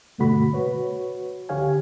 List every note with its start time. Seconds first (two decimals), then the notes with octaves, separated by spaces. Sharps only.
0.18 G2 B2 D3 A3 F#4 B5
0.53 F#4 B4 C#5
1.49 C#2 D3 G4 C#5 F5 G#5